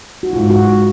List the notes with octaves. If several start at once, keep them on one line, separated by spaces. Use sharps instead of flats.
F#4
G#2 F4
F#4